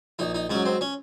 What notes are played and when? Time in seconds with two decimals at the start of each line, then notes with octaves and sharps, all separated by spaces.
0.19 A#1 D#4
0.34 D#4
0.50 G#2 F#3 C#4
0.65 C4
0.81 C#4